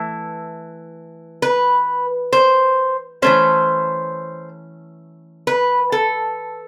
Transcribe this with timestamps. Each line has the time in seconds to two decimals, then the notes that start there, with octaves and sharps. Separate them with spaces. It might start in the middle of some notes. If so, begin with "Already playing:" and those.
Already playing: E3 A3
1.42 B4
2.33 C5
3.22 E3 A3 C#4 C5
5.47 B4
5.92 A4